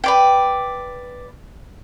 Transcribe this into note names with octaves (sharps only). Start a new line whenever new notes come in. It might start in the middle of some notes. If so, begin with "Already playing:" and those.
B4 D5 G5